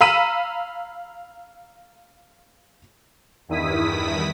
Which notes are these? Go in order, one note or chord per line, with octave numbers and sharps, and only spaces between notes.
F5 A#5 B5 E6 B6 D#7
E2 G2 D#3 E4 D#6 B6